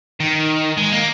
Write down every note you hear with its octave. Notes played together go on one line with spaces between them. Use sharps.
D#3
G#3
A#3